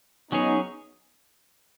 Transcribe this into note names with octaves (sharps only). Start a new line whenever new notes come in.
F#3 B3 C#4 D#4 G#4 C#5